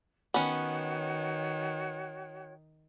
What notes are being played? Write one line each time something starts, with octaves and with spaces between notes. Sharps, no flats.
D#3 B3 C#4 F#4 C#5 G5